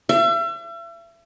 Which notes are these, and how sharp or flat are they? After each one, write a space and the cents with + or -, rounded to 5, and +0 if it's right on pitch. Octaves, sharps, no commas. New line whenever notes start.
E5 +40